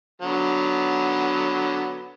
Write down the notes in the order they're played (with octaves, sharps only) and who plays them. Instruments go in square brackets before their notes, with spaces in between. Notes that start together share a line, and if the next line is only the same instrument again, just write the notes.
[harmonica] D3 F#3 B3